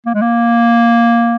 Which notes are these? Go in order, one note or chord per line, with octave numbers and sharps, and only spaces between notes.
A#3
G#3
A#3